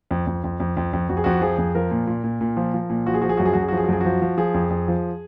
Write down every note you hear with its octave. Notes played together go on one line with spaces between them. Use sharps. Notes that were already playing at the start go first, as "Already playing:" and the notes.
F2
F2
F2
F2
F2
F2
F2 F#4
G#4
F2 F#4
F3 G#4
F2
F3 A#4
A#2
A#2
A#2
A#2
F3
F3
A#2
F3 F#4
G#4
F3 F#4
G#4
F#2 F#4
G#4
F#2 F#4
G#4
F#4
F3
G#4
F#4
F#2 G#4
F3 F#4
F3
F3 G#4
F2
F2
F3